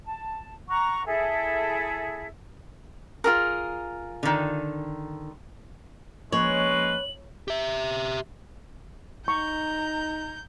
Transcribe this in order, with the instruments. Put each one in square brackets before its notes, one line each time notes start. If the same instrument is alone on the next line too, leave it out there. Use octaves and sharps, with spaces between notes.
[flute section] A5
F#5 A#5 C#6
E4 G#4 A4 E5
[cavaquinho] F4 G#4 A#4
[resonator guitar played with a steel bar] D3 D#3
[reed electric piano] F3 A#3 D#5 [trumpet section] G#3 C#4 B4 [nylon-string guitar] C#5 [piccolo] F#7
[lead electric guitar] G4 E5
[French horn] D#4 [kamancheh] A#5 [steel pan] C#6 [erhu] G6